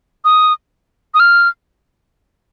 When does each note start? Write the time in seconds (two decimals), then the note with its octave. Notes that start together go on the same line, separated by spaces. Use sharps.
0.25 D#6
1.14 D#6
1.20 F6